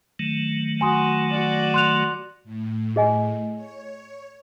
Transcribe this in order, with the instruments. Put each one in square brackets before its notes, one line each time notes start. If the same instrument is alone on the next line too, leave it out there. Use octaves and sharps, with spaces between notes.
[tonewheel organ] D#3 F#3 A3
[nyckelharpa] F#4 [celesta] G#5 C6 D#6
[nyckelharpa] F#4 D5
[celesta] C6 F#6 F7
[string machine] A2
[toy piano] G#4 D#5 G#5
[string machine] C#5